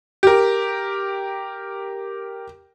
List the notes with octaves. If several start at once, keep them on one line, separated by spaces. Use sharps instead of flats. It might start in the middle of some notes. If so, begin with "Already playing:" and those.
G4 A#4